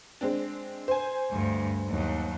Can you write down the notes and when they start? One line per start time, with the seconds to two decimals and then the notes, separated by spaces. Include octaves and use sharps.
0.21 G#3 C4 D4
0.88 C5 G#5
1.31 D2 G2
1.88 D#2 F#3